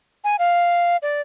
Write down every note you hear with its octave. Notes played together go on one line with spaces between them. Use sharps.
G#5
F5
D5